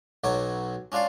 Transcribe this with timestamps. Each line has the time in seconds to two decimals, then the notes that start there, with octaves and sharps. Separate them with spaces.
0.24 B1 B2 F#3 C#5 D6
0.92 C#4 D4 F4 D5 F5